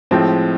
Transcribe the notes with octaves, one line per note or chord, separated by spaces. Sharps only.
A2 F3 G#3 C4